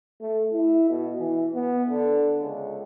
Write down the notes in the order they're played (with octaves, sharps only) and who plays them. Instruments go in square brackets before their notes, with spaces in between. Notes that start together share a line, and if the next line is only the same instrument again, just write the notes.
[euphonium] A3
E4
B2
E3
B3
D3
C#2